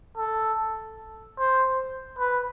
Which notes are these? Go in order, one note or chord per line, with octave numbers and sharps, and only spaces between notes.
A4
C5
B4